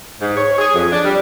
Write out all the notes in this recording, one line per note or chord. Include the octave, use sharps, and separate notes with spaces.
G#2
C#5
G#4
F2
D4
G3